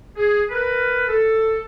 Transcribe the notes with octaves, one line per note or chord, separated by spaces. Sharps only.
G#4
A#4 B4
A4